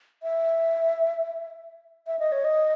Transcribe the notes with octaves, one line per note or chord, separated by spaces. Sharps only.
E5
E5
D#5
C#5
D#5